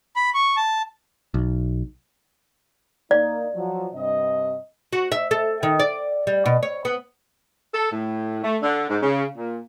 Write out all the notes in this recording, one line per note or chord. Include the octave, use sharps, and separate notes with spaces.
B5
C#6
A5
B1
A#3 D#4 D5
F3 F#3
G2 C3 D#5
F#4
E5
A4
D#3
D5
G3
B2
C#5
B3
A4
A2
A3
D3
G#2
C#3
A#2